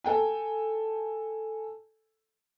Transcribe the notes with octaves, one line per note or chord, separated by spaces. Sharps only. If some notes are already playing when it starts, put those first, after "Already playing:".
A4 G5 G#5